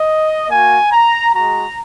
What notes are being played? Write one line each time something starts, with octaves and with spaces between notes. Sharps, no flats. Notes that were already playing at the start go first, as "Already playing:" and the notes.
Already playing: D#5
A#3 F#4 G#5
A#5
G#3 F#4 A#5